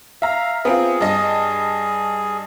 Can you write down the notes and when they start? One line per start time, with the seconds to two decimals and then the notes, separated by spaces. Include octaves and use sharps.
0.22 E5 F5 A#5
0.65 B3 C4 F4 G#4
1.01 G2 D#5